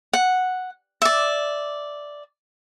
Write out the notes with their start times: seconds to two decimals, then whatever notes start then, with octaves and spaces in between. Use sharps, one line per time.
0.13 F#5
1.02 D5 E5